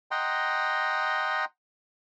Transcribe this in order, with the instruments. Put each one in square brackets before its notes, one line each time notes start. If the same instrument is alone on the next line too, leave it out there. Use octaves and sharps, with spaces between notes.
[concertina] D#5 F#5 G5 A#5 C6